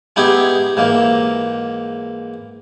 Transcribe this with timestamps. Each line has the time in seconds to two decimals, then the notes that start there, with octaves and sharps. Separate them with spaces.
0.16 G#3 B3 D#4 E4 G4 G#4
0.77 G#2 E3 A#3